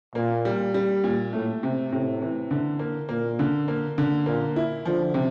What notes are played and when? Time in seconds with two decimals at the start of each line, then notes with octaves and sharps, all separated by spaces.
0.15 A#2 A#3
0.45 G3
0.74 G3
1.04 A#2
1.33 A2 A3
1.63 C3
1.92 A2 C3
2.22 E3
2.51 D3
2.79 A#3
3.09 A#2 A#3
3.39 D3
3.68 A#3
3.98 D3
4.26 A#2 A#3
4.56 E4
4.85 D3 F3
5.14 C3